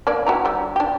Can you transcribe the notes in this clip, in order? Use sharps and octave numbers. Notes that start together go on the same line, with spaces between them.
A#3 D4 D5
F#4 G4 A#5
D3 G3
D4 G4